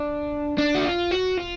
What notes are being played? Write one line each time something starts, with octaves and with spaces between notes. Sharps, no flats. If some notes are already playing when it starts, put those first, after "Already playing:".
Already playing: D4
D4
F#4
F4
F#4
F4